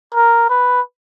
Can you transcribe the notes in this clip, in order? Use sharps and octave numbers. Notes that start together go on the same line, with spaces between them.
A#4
B4